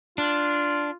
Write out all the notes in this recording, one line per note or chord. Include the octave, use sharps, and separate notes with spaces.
D4 F4